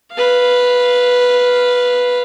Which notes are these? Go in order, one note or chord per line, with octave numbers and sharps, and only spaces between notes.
B4 F5